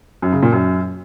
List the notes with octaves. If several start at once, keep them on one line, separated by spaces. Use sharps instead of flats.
F#2
C#3
A#2
F#2